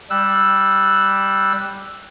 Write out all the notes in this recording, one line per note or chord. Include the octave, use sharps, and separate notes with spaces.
G3 E6 F#6